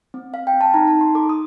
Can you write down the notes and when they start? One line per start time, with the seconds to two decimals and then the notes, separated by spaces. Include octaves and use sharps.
0.14 C4
0.33 C4 F5
0.47 G5
0.54 C4
0.61 A5
0.74 D#4 A#5
0.88 A5
0.95 D#4
1.01 C6
1.15 A4 D6
1.29 D#6